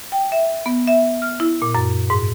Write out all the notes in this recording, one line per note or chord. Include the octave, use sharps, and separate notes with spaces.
G5
E5
B3
E5
F6
E4
A#2
F#2
G#2